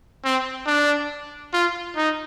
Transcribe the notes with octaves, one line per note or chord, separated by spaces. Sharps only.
C4
D4
F4
D#4